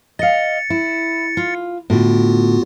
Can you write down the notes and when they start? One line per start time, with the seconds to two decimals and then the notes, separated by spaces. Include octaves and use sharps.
0.19 D#5 F5 A6 C#7
0.70 E4
1.37 F4
1.90 A2 D3 B3 F4 F#4